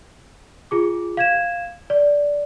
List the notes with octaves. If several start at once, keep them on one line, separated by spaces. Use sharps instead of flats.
F4 G#4 D6
F5 G#6 E7
D5